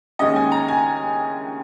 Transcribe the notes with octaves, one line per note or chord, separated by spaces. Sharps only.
D#2 D#3 G#3 C#4 D#5
G#5
A#5
G#5